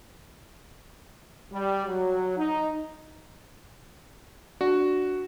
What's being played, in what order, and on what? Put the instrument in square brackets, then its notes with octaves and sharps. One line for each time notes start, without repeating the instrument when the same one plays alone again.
[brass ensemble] G3
F#3
D#4
[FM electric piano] D4 [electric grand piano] F#4